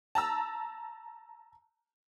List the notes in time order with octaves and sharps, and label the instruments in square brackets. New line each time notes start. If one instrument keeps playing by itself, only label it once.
[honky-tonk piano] A5 A#5 E6